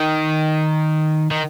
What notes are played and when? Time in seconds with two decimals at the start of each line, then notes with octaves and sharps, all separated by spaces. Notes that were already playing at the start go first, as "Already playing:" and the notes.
Already playing: D#3
1.31 D#3